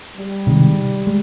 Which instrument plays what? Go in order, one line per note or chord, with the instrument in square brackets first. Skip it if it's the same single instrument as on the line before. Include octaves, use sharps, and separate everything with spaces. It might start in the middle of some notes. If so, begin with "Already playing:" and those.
[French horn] G3
[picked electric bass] C3 D#3 G#3
G#3